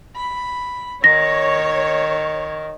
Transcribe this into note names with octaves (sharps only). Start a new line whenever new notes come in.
B5
D#3 C#5 A#6